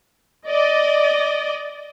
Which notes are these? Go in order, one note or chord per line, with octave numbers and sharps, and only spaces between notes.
D5 D#5